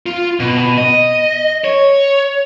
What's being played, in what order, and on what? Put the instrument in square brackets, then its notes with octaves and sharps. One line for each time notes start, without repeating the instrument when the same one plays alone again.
[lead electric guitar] F4
B2
D#5
C#5